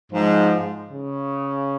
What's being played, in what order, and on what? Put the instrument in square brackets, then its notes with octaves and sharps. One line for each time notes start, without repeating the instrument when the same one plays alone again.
[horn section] G#2 [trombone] F3
[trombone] C#3